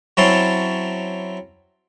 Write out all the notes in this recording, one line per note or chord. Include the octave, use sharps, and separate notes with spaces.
F#3 C4 C#4 E4 A5 C6